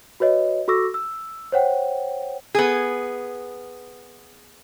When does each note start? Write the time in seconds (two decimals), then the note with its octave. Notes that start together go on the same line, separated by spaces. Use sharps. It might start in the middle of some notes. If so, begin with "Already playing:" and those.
0.20 F#4 B4 C#5 D#5
0.68 F#4 A4 C#6 D6 E6 A#6
0.94 E6
1.52 C5 C#5 F#5 G5
2.55 B3 G#4